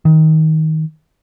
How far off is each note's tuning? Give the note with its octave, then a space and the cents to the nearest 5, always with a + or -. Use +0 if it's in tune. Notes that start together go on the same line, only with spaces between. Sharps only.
D#3 +20